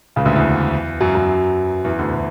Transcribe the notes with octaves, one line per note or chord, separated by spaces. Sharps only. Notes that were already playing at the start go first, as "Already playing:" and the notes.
C#2 C#3
D2 D3
E2 E3
F#2 F#3
F#2 F#3
E2 E3
D2 D3
D3